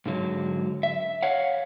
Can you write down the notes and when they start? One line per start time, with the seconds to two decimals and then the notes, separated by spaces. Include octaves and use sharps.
0.06 G#2 D3 F#3
0.83 E5
1.23 C#5 F5 F#5